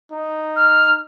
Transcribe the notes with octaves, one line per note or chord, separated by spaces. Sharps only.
D#4
F6